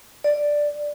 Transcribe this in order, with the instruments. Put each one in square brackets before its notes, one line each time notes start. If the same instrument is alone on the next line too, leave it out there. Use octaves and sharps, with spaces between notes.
[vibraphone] D5